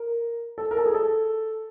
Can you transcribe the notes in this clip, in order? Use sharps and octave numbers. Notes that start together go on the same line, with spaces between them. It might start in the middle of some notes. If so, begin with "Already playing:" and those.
Already playing: A#4
A4
A#4
A4
G#4
A4